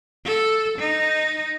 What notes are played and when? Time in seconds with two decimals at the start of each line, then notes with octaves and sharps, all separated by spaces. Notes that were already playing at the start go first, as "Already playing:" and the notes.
0.24 A4
0.78 D#4